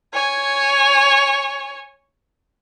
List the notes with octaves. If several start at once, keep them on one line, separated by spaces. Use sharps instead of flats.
C#5 G#5